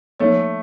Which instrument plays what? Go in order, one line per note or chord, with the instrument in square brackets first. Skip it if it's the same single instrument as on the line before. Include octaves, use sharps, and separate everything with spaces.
[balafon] F3 A#3 D#4 A4 C#5 [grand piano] A3